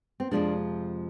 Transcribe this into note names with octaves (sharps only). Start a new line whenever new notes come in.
C4
F2 C3 F3 G#3 A#3 D4